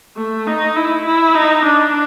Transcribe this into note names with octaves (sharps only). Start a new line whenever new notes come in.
A3
D#4
E4
E4
D#4
D4